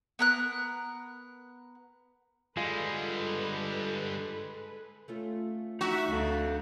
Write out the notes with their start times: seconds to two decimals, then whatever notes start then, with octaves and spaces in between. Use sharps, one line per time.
0.19 B3 A#4 F#6
2.57 D3 G3 G#3 F4 A4 B4
5.08 A3 C#4 F4
5.81 D#4 F#4 E5
6.12 D2 A4 F5